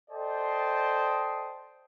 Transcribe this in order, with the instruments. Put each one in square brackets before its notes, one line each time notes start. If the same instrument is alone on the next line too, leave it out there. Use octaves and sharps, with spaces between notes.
[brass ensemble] A4 C5 D5 D#5 G5 A5